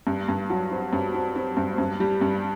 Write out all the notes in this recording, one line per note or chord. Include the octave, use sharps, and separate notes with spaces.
G2
G2
F#3
C4
G2
C4
C4
G2
G2
G3
G2